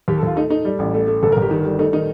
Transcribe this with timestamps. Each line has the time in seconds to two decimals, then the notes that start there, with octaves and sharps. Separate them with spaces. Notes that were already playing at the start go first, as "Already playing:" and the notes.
0.08 D#2 G4
0.18 A4
0.23 D#2 F4
0.36 A3 D#4
0.50 A3 D#4
0.65 G3
0.79 A1
0.94 A3
1.07 A3
1.23 G1 A4
1.32 A#4
1.37 G1 G4
1.51 D#3
1.65 G3
1.79 A3 D#4
1.93 D#3 D#4